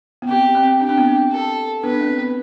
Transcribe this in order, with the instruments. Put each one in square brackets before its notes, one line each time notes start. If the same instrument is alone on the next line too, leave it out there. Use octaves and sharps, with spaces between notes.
[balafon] B3
[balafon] C4 [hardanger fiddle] G4
[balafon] C4
[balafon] D4 [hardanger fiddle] G4
[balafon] C4
B3 D4
[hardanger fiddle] A4
[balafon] B3 D4 [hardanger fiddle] B4
[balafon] C4
B3